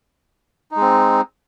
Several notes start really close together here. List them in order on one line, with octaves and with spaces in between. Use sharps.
D#4 G#3 C4